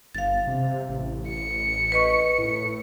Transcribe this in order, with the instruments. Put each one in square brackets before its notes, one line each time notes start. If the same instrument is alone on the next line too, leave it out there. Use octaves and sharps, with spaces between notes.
[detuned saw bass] G1 [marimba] F5 A6
[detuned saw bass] C3
A1
[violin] C#7
[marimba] B4 D#5 C#6
[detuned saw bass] A2